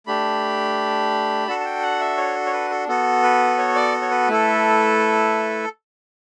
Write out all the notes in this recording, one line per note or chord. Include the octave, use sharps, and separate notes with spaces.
A3 D4 G4 B5
D4 F#4 A4 A5
A5
G5
F#5
E5
C#5
C#5
B4
A4
B3 F#4 A4
B4
C#5
D5
C#5
B4
A3 E4 A4